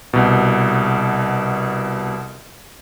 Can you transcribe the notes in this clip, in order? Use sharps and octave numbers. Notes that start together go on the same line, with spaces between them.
C2 B2